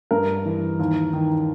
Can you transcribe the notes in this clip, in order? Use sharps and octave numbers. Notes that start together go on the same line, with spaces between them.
G2 A#4
E3
D#2
D#3